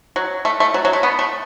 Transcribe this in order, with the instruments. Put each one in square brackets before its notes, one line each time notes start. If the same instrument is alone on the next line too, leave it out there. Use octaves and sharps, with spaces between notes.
[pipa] F#3
A3
A3
F#3
F#3
A3
B3
A3